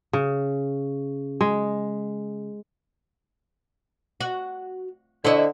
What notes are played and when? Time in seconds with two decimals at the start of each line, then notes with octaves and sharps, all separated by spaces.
0.13 C#3
1.41 G#3
4.20 F#4
5.25 D3 E4 C#5 D#5